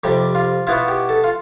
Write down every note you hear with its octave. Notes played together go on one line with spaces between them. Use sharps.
F2 C3 G3 G4
F4
B2 B3 E4 F4
G4
A4
F4